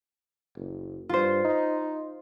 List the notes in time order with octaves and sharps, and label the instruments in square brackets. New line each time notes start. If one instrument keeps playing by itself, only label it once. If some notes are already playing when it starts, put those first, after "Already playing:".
[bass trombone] F#1
[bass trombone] G2 [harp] F4 C5
[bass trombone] D#4